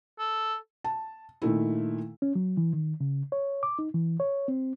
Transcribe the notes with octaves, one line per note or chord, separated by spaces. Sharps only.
A4
A5
A#2 D#3 A3 E4
C#4
F#3
E3
D#3
C#3
C#5
D6
D#4
E3
C#5
C4